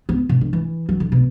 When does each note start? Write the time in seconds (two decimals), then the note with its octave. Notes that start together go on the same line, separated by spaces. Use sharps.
0.09 B3
0.29 B2
0.41 D3
0.53 E3
0.89 F#3
1.00 D3
1.12 B2